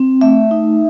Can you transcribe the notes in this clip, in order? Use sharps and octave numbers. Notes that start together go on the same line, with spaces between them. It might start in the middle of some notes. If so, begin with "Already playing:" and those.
Already playing: C4
A3 E5
D#4